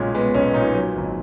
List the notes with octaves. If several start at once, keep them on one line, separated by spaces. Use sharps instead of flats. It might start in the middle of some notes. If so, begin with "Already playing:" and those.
Already playing: B1 A#2 G#3 C#4
G#3 B3
B1 C#4
A#2 D#4
F#3
G#1